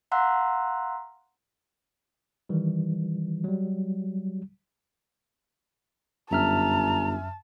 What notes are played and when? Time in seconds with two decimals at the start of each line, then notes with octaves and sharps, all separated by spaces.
0.12 F5 F#5 A#5 C6 E6 F#6
2.49 D#3 E3 G3
3.44 F#3 G3
6.31 G1 F#2 E5 A5 A#5 F6